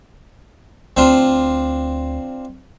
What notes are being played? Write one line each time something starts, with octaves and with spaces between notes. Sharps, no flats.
D2 C4 D4 F4